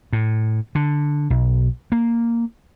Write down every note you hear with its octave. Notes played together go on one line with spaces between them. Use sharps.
A2
D3
B1
A#3